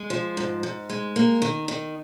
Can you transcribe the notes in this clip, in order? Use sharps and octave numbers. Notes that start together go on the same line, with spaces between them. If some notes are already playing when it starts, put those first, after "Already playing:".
Already playing: G#3
F3
G#2
G#2
G#3
A#3
D#3
D#3